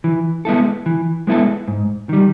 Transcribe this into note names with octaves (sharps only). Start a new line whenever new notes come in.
E3
G#3 B3 E4 A4
E3
G#3 B3 E4 A4
G#2
D#3 G3